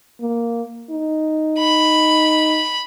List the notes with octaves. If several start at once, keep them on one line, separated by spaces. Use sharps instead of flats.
A#3
D#4
B5